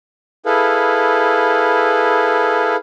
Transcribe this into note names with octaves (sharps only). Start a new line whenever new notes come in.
E4 G#4 A4 B4 F5